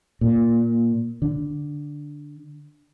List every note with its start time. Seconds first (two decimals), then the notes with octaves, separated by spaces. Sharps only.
0.21 A#2
1.22 D3